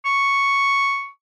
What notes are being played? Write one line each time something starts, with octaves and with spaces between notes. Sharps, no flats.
C#6